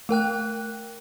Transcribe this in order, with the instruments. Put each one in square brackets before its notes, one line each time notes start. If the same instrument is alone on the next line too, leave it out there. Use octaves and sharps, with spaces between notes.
[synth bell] A3 A#4 G5 F#6